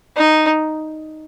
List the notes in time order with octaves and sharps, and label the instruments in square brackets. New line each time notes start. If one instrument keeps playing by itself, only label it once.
[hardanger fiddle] D#4